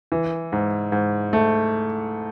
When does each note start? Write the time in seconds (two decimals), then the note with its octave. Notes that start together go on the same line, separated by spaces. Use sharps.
0.12 E3
0.52 G#2
0.92 G#2
1.33 A3